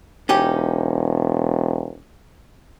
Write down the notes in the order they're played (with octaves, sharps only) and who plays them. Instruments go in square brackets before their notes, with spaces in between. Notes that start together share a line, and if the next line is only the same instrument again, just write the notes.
[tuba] E1 [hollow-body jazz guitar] C#4 D#4 G4